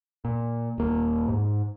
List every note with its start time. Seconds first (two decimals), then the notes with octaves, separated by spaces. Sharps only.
0.25 A#2
0.78 D#1 A#3
1.28 G#2